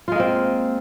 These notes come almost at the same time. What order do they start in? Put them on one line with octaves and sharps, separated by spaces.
F4 G#3 A#3 C4